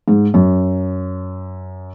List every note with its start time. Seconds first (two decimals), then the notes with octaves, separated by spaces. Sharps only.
0.08 G#2
0.34 F#2